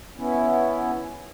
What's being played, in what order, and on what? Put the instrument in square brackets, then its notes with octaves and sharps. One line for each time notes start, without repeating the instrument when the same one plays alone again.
[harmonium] B3 C#4 E4